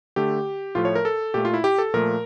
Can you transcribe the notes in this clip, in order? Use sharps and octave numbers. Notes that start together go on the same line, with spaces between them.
D3 A3 G4
A2 F3 A3 F4
C#5
A#4
A4
A#2 A3 G4
F4
E4
G4
A4
A#2 F3 A3 A#4